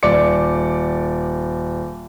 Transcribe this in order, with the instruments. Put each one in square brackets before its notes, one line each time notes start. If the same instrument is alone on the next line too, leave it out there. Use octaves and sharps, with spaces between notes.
[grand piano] D#1 D5 D6 C#7